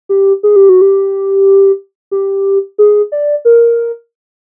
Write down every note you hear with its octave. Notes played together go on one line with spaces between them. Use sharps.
G4
G#4
G4
F#4
G4
G4
G#4
D5
A#4